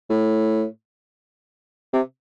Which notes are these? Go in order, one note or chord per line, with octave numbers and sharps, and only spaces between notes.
A2
C3